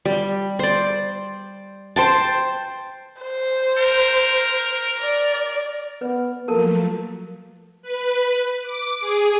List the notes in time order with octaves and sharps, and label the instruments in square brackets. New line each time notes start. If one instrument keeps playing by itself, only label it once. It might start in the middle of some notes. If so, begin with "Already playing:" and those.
[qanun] G3
C5 D5
C5 G5 A5
[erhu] C5
[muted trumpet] A#4
[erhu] D5
[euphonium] B3 [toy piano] B4
[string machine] F3 F#3 A3 [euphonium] A#3 [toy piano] A4 A#4 A5
[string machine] B4
D6
G#4